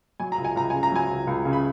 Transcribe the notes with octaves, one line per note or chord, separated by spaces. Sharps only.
F#3 G#5
A#5
C#2
G#5
C#2 A#5
C#3 G#5
A#5
F#3 G#5
C#2
C#2
C#3
B5